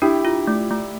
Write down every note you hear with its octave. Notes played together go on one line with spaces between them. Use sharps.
D4 E4 G4
F4
A3
A3